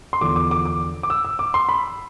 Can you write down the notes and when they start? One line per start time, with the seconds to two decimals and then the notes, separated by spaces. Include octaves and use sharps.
0.13 C6
0.21 E2 D3 F3 D6
0.36 D6
0.51 D6
0.65 D6
1.03 D6
1.10 E6
1.25 E6
1.39 D6
1.54 C6
1.69 B5